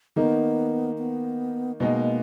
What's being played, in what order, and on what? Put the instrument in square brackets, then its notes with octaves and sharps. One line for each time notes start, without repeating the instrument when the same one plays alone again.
[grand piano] D#3 A#3 D#4 [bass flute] B3
[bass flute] B3
[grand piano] B2 G#3 B3 D#4 [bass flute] A#3